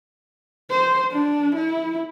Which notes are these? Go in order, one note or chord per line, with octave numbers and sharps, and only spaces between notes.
C5
D4
E4